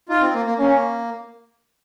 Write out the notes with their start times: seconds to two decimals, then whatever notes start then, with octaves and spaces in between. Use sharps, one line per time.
0.09 D#4 F4
0.21 C4
0.34 A#3
0.46 A#3
0.58 A#3 C#4